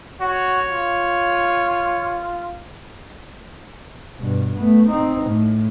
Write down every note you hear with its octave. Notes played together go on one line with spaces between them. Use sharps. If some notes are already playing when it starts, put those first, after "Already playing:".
F#4 C#5
F4
G2 B2
A3 B3
C4 D#4
A2